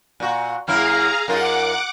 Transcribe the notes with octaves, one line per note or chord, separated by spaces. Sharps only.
A#2 F#4
F#2 A#3 E4 G#4 F5 A#5 F6
F#2 D#4 F4 A#4 F#5 D6